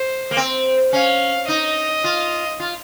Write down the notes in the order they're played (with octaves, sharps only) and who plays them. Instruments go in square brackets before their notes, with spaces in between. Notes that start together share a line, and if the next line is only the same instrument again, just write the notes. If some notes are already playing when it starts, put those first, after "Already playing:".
Already playing: [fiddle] C5
[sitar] A#3
C4
[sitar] C#4 [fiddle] F5
[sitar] D#4 [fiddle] D#5
[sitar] F4
F4